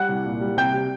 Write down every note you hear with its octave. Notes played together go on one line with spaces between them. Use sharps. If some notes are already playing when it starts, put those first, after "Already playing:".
Already playing: G3 F#5 F#6
C2
A#2
G3
C3 G5 G6
C3